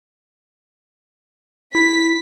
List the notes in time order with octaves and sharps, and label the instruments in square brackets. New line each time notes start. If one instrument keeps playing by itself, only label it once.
[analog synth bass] E4 [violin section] B6